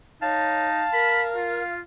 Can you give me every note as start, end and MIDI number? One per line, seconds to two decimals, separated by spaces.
0.22 0.85 63
0.22 0.68 73
0.22 1.77 77
0.22 1.51 81
0.93 1.62 70
0.93 1.22 83
1.36 1.80 65